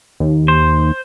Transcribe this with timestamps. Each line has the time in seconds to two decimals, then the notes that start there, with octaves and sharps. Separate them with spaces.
0.20 D#2
0.48 C5